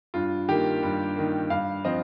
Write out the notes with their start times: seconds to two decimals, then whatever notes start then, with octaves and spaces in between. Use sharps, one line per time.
0.14 G2 F4
0.48 D#3 A#3 G4
0.83 G2
1.16 D#3 A#3
1.50 G2 F5
1.85 F3 C4 D#5